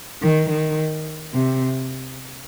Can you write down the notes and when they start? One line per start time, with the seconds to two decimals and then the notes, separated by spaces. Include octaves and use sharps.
0.22 D#3
0.50 D#3
1.34 C3